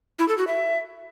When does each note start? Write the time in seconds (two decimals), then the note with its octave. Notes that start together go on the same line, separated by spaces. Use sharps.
0.19 E4
0.28 A4
0.38 F#4
0.47 E5